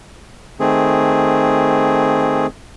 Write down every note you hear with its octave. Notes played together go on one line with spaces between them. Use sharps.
D#3 A3 C4 G#4